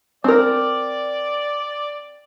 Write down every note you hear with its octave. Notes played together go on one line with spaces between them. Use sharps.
C4 A#4 D5